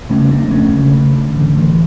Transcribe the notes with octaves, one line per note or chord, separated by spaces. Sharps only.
C#3 A3 C#4
F2 A#3 D4
A#3
D2 A3 C#4
C#3
C#3
D3
A1
A1